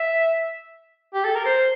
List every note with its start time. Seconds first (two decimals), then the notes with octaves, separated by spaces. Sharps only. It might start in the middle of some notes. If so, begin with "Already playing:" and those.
Already playing: E5
1.14 G4
1.24 A4
1.35 A#4
1.45 C5